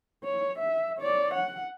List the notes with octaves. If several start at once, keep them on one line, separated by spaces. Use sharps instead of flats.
C#5
E5
C#5 D5
F#5